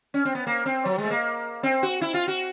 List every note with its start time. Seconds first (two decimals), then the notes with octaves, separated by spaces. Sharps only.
0.14 C#4
0.25 C4
0.35 B3
0.47 A#3
0.66 C4
0.85 F#3
0.98 G#3
1.04 A3
1.10 A#3
1.63 C4
1.83 F#4
2.01 E4
2.14 F4
2.28 F#4